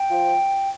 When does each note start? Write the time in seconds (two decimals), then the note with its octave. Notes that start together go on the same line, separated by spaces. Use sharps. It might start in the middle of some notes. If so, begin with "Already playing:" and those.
Already playing: G5
0.10 F3